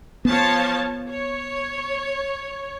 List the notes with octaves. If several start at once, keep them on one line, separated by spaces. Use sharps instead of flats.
F3 B3 C#5 A5
C#5